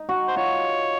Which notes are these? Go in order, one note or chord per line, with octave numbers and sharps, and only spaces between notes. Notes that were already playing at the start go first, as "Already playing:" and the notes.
Already playing: D#4
F#4
C5
F4 C#5